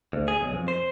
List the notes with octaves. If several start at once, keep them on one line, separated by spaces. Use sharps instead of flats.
D2
G#4
B1
F2
C5